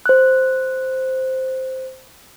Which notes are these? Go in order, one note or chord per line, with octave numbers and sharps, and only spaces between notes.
C5 F#6